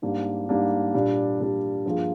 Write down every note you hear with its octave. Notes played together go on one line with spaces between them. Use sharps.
G#2 G3 A#3 D4
G#2 G3 A#3 D4
A#2 G3 D4
A#2 G3 D4
G2 F3 A#3 F4 G#4